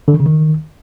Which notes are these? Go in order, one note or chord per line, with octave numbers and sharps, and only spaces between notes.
D3
D#3
C#3
D#3